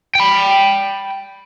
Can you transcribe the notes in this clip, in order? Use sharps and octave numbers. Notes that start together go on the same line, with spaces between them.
G5 B5